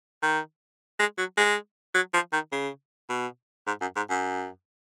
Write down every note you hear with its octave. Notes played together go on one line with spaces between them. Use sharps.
D#3
G#3
F#3
G#3
F#3
F3
D#3
C#3
B2
G#2
F#2
G#2
F#2